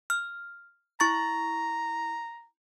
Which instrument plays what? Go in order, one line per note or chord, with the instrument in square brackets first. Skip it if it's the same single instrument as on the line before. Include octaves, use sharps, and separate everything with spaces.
[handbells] F6
[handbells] E4 C#6 A6 [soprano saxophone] A#5